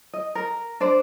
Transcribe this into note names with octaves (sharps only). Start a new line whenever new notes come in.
D#5
A#4
D4 C5 D5